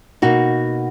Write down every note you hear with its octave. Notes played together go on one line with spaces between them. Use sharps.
B2 A#3 D#4 F#4